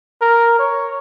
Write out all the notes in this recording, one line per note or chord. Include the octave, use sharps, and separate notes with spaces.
A#4
C#5